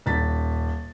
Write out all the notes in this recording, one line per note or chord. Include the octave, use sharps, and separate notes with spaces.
D#1 A6 B6